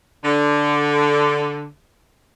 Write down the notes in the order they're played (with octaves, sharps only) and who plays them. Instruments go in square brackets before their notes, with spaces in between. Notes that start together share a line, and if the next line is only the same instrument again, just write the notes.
[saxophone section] D3